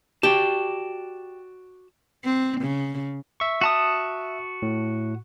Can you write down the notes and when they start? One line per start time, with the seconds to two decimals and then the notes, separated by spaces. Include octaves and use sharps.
0.23 F#4 G4 D5 A5
2.24 C4
2.61 C#3
3.40 E5 C#6
3.61 F#4 A5 D#6
4.62 A2